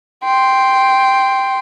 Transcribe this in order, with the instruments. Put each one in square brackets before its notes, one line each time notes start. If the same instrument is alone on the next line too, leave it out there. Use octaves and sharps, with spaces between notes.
[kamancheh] G5 C6